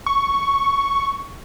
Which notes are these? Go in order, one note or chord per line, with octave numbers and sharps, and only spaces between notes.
C#6